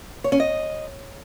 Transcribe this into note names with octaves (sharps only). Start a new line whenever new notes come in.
C#5
C#4
D#5